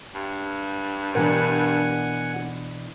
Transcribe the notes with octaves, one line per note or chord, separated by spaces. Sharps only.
G2
B2 E3 D4 A#4 F#5 G#5